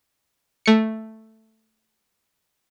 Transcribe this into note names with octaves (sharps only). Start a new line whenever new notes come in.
A3 C#7